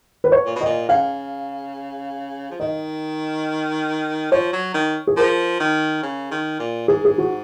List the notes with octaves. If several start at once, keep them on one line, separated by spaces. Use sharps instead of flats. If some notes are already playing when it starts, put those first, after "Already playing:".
B4
C#5
A#2
B2
A#2 D#5
C#3 F5
F3
D#3 D#5
F3 C#5
F#3
D#3
G#4
F3 A#4
D#3
C#3
D#3
A#2
G#2 G#4
G#4
F#4